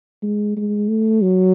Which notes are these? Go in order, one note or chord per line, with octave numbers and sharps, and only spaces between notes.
G#3
G#3
A3
F#3